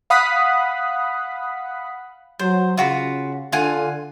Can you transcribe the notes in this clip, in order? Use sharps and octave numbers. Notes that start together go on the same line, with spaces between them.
F5 F#5 B5 D#6 F#6 B6
F#3 C5
C#3 F4 F#4 B5
D3 F4 F#5 G#5